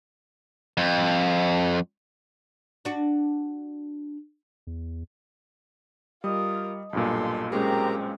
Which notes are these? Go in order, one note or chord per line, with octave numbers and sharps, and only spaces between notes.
F2
D4 F#4
E2
G3 F4 A#4 D#5
B1 G2 A#2 A4 C6
G#3 C4 C#4 G4 G#4 A#4 A#5